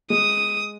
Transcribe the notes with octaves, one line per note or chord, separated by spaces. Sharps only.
G#3 D#6